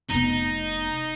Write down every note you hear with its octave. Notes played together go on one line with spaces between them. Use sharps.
F1 B3 D#4